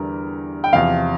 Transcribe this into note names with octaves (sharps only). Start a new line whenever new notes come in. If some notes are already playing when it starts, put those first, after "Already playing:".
Already playing: E2 D3 G3 A#4
G5
E2 C3 F3 F5